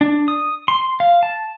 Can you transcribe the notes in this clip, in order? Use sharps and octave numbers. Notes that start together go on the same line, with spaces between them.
D4
D#6
C6
F5
A5